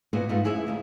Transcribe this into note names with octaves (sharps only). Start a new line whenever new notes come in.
A#2 A#3 B3 E4 F#4 G#4
G#2 A3 B3 F4
F#2 E4 G#4 C#5 E5
D2 A#2 D#3